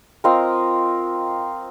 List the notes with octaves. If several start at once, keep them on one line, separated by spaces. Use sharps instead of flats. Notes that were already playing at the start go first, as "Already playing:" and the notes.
C4 F4 A#4 D#5